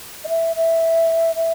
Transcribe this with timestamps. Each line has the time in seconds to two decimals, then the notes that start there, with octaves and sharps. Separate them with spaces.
0.24 D#5
0.28 E5
0.56 E5
1.36 E5